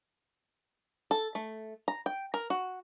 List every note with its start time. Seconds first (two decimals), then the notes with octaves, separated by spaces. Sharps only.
1.11 A4
1.35 A3
1.88 A#5
2.06 G5
2.34 A#4
2.50 F#4